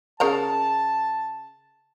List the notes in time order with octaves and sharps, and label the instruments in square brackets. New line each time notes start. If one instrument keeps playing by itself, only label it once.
[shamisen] C#3 A#4 A#5 [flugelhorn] A5